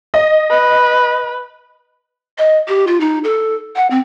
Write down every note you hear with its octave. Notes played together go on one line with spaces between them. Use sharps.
D#5
B4
D#5
G4
F4
D#4
A4
F#5
C4